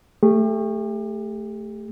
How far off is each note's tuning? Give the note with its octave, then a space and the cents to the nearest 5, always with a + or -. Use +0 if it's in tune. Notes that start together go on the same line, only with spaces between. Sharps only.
A3 +0 G4 +35